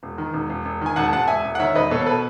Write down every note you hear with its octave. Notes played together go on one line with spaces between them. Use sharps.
E1
D#3
E1
E1
E1
D#3 G#5
E1 F#5 A5
E1 F#5 A5
E1 E5 G#5
E1
F#5
D#3 C#5 E5
E1 B4 D#5
B2 A4 C#5
A4
B4